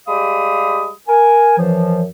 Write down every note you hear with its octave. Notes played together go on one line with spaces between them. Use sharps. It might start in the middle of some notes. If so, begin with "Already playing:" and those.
G3 G#3 G4 F5 B5 D#6
A#4 G#5
F#2 E3 F3